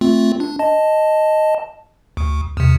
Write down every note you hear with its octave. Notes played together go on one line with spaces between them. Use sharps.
A3 C4 F4
D4
D#5 A5
D2
E2 C3